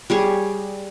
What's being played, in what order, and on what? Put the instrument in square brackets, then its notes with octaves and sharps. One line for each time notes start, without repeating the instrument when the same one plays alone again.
[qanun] G3 G#4 C#5